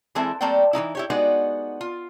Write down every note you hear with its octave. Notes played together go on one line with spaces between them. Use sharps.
E3 G#3 C4 E4 A4 E5
G3 A3 A#3 C4 D5 G5
E3 A3 D#4 E4
E4 G4 C#5
G#3 B3 D#4 F#4 D5
F4